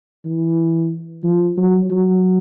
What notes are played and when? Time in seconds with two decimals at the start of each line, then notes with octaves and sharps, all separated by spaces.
0.25 E3
1.24 F3
1.57 F#3
1.90 F#3